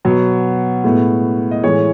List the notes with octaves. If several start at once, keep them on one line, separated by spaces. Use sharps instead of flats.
B2 F#3 B3
A2 G#3 B3
D#5
A2 E3 G#3 C#5